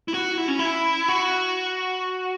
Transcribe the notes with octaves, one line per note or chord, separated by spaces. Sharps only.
E4
F#4
E4
C#4
E4
F#4